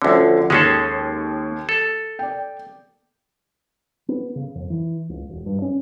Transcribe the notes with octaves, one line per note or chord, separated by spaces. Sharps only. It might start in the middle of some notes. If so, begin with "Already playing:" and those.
D2 D3 F3 C#4
D#2 G#3 C#4 A4 D#6 C7
A4
D5 G5
B3
C#3
F2
E3
C#2
E1
G2
C#4